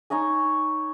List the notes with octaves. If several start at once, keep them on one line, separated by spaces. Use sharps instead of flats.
D#4 C#5 D#5 G#5